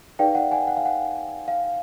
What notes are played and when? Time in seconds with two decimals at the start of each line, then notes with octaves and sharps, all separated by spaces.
0.19 D#4 G#4 B4 D5 F5 G5
0.35 F#5
0.51 F#5 G#5
0.67 F#5
0.77 F5
0.86 F#5
1.48 F5